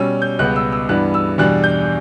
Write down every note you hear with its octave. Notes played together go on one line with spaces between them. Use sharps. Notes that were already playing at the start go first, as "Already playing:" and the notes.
Already playing: B2 G3 C#4 E6
G6
C#2 B2 G3 B3 F#6
E6
E6
G2 E3 B3 D4 F#6
E6
E2 B2 G3 D4 F#6
G6